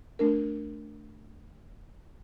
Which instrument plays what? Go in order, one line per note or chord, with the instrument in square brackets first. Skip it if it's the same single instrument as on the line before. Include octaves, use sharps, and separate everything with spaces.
[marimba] A3 D4 A#4